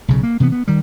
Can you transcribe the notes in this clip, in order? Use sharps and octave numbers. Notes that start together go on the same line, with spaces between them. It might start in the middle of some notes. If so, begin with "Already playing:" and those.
B1 C#3
A#3
C3 E3 F#3 B3
B3
D#3 G3